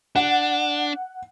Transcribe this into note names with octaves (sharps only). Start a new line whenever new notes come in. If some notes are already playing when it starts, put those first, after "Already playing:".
D4 F#5